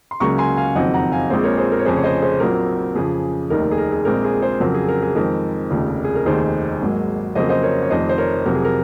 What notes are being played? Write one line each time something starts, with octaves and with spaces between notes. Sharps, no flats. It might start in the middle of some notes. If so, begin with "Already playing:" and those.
C6
C#2 C#3 F#3 A#3 A#5 C#6
G#5 C6
F5 G#5
F#1 F2 D#3 F#3 C4 D#5 F#5
F#5 A#5
F5 G#5
A#1 A#2 G#3 C4 G#4 C5
A#4 C#5
G#4 C5
A#4
C#5
F1 F2 C#3 G#4 C5
C#5
C5 D#5
G#4 C5
A#1 A#2 F#3 C4 A#4
F2 C#3 F3 G#4
F1 D#2 D#3 A#4
A#4
G#4
A#4
G#4
A#1 A#2 G#3 C4 A#4
G#4
G#4 C5
F2 C#3 F#3 C4 A#4
G#4
A#4
G#4
F2 D#3 G#3 C4 A#4
F1 D#2 C#3 F3
G#4
A#4
F1 D#2 D#3 G#4 C5
G#1 G#2 F#3 A#3
F2 C#3 F#3 A#3 C5 D#5
C5 D#5
A#4 C#5
C#5
F1 F2 D#3 C5 D#5
C5
A#4 C#5
F2 C3 F#3 A#4
G#4
A#4